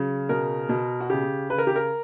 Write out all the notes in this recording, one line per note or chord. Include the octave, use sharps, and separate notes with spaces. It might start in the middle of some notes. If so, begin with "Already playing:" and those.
Already playing: C#3 F#3
B2 A#4
B2
F#4
C#3 G4
C#3 B4
A#4
G4
A#4